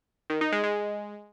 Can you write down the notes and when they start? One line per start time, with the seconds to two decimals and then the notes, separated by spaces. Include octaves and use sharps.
0.30 D#3
0.41 D#4
0.52 G#3
0.64 G#3